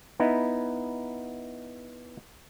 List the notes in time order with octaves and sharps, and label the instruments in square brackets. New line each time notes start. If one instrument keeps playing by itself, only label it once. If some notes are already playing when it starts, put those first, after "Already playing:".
[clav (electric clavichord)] B3 D#4 E4